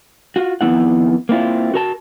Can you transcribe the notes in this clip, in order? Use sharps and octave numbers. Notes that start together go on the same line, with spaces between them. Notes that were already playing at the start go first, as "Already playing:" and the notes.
F4 F#4
F2 D#3 G3 B3 E4 F#5
A#3 C4 E4 F4
F#4 A#4 A5